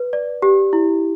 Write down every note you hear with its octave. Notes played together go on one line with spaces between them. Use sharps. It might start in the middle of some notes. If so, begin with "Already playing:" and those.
Already playing: B4
D5
G4
E4